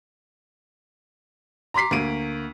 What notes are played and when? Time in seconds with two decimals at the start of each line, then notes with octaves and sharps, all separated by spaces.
1.74 A#5 C6 D6 B6 C7
1.91 D2 A#3 D7 D#7